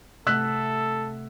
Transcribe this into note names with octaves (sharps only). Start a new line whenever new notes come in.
C3 A3 A4 F#5 E6 F#6 B6